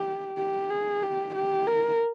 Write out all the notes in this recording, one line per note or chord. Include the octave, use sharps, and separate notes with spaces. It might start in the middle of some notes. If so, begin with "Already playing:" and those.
Already playing: G4
G4
G#4
G4
G4
A#4